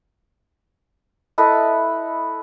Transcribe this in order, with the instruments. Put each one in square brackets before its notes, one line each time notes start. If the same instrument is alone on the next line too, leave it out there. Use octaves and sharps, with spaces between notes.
[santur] E4 A4 B4 D#5